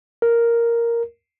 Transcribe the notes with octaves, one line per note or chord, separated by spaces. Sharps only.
A#4